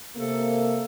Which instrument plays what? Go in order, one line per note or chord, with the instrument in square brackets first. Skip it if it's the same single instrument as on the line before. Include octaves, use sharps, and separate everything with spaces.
[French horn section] C3 A#3 [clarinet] A4